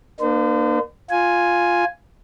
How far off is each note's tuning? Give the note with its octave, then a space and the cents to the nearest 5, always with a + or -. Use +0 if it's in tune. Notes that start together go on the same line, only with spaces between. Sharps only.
A#3 +10 D4 +45 C5 -40
F4 +0 G#5 +0